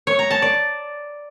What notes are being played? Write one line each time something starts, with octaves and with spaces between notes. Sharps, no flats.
C#5
A#5
A5
D5